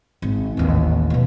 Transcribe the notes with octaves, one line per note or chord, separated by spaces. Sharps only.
G#1
A1 D#2
B2 F#3